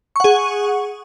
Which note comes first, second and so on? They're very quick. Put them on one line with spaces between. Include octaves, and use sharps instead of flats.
C#6 F#5 G#4